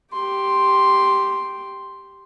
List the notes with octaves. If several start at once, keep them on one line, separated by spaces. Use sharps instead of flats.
G4 C6